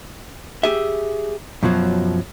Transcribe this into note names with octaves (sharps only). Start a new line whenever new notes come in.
G4 G#4 E5
F#2 B2 F3 F#3